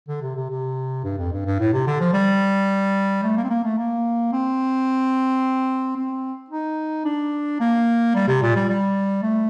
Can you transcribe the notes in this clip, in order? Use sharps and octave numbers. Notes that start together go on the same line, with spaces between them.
D3
C3
C3
C3
G2
F2
G2
G2
A2
C3
D3
F3
G3
A3
A#3
C4
A#3
A3
A#3
C4
C4
D#4
D4
A#3
G3
C3
A#2
G3
G3
A3